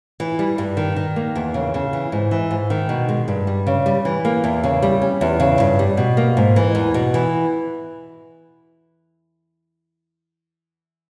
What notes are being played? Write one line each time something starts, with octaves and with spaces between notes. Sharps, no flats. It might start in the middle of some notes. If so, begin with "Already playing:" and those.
E3
G3
G2
D#3
D#3
A#3
E2
C#3
C#3
E3
G#2
E3
G#2
D#3
B2
G#3
G2
G3
C#3
G3
E3
A#3
E2
C#3
G3
C#4
E2
C#3
G2
G3
B2
A#3
G#2
E3
E2
B2
E3